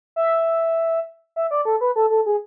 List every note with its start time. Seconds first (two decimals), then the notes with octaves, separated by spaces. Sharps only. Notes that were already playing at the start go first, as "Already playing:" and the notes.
0.16 E5
1.36 E5
1.51 D5
1.65 A4
1.81 B4
1.96 A4
2.10 A4
2.26 G#4